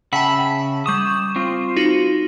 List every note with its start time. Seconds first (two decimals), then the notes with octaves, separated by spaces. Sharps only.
0.13 C#3 E5 F#5 G5 A5 B5
0.86 G3 C#6 D#6 E7
1.36 C4 F4
1.77 D#4 F#4